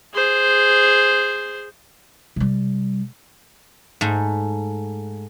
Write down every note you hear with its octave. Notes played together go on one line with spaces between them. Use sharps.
G#4 C5
C3 G3
G#2 A3